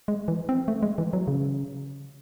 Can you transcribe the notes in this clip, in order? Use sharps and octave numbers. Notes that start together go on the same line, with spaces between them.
G#3
E3
C4
A3
G#3
E3
F#3
C#3